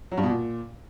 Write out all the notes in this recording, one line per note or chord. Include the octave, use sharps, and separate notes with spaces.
F#3
G2
B2
A#2